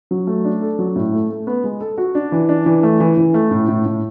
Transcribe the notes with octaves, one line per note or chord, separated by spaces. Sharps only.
F#3
A3
D4
A4
F#3
A2
A3
A3
B3
G#3
A4
F#4
D4
E3
D4
E3
A3
E3
E3
A3
A2
A2
A2